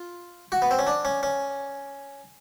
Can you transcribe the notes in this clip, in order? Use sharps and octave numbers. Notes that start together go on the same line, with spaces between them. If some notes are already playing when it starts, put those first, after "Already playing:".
Already playing: F4
F#4
B3
C4
C#4
D4
C#4
C#4